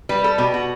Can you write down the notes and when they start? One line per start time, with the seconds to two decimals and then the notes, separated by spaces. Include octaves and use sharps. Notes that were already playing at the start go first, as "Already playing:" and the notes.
0.09 G3 B4
0.24 A4
0.38 B2 G4
0.54 F#4